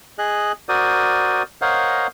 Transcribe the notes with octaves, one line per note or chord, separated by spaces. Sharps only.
G#4 D#5 F#6
F#4 A#4 C5 D5 D#6
A#4 C5 C#5 D#5 F5 F#5